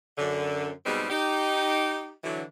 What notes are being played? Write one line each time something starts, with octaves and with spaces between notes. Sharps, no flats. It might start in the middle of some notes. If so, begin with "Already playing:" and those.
F#2 D3
G#2 B2 G3 G#3 C4 D#4
D#4 G4
D3 E3 F#3